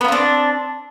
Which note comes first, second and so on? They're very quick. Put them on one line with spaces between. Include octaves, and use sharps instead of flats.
B3 F4 C4 D4